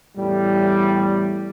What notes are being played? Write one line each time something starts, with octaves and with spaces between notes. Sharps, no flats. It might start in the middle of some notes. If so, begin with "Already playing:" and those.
E2 A2 G3